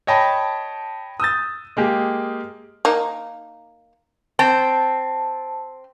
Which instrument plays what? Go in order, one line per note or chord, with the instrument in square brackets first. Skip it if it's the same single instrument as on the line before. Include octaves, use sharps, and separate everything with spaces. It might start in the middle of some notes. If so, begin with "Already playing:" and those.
[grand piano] C#5 D#5 G5 A5 B5
D#6 E6 G6 A6
G#3 A#3 G4
[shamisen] A#3 D#4
[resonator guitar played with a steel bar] C4 [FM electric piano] A5